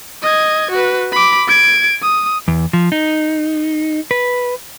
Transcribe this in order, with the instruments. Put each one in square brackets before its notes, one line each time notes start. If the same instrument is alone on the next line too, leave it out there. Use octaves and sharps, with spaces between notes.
[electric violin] D#5 G#6
F#4 B4
B5 D6
G#6 D7
D#6
[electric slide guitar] E2
F3
D#4
B4